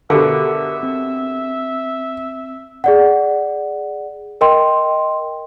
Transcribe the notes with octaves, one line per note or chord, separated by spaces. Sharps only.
B2 D3 G4 A4 A#4 E5 F5 D6
C4
G#4 D5 F#5
A#4 D#5 G5 C6